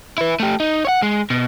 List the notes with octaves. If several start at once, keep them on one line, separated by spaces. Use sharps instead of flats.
E4 B4
A3 G4
D#4
C#5 F#5
G#3
B2